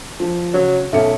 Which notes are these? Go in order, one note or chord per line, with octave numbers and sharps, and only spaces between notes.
F3
C#3 F#3
B1 A3 C#4 C#7